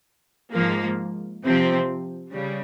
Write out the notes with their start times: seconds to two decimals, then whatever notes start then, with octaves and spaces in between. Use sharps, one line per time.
0.53 G#2 F3 A#3
1.43 C3 F3 C4
2.33 C#3 G3